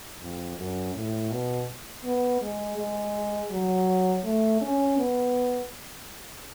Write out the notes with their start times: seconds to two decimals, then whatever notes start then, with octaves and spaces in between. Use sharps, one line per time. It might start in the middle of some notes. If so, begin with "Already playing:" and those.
0.21 F2
0.57 F#2
0.95 A2
1.31 B2
2.04 B3
2.42 G#3
2.78 G#3
3.51 F#3
4.24 A3
4.61 C#4
4.98 B3